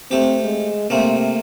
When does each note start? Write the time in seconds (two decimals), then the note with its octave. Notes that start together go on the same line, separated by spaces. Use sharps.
0.11 A3 C4 G4
0.44 G#3
0.90 C3 A3 A#3 C4